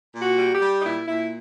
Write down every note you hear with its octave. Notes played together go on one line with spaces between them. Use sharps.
A#2
F#4
G3
G4
G3
D#4
A#2 E4
A#2 E4